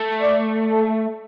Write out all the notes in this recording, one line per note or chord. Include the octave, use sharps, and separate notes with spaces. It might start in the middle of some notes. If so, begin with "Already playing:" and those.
Already playing: A3
D5
A4